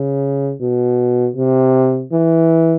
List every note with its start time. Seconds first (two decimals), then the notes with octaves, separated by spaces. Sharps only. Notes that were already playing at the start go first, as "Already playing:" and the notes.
Already playing: C#3
0.61 B2
1.36 C3
2.12 E3